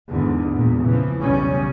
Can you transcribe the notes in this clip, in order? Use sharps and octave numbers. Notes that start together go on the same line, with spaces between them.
E2 G#2 D3
E2 A#2
C#3 E3 F3
B1 E2 C#3 G3 C#4